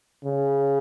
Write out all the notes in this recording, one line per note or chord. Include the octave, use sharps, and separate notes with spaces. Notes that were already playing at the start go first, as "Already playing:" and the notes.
C#3